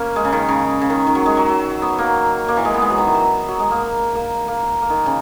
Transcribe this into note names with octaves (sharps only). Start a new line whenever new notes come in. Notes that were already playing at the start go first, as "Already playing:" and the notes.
Already playing: A#3 C#4
G#3
C#3
D#3
C#3
C#3
D#3
D#3
F#3
G#3
F#3
F#3
B3
A#3
A#3
E3
G#3
B3
G#3
F#3
D#3
E3
F#3
F#3
G#3
A#3
A#3
A#3
A#3
D#3
C#3